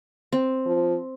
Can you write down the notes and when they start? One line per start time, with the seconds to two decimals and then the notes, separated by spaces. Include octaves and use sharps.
0.32 C4
0.66 F3